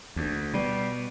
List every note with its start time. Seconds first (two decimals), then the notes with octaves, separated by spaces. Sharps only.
0.16 D2
0.54 B2 G3